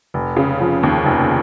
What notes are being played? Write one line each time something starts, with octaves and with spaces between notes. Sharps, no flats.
F1
C#3
F3
D#2
F1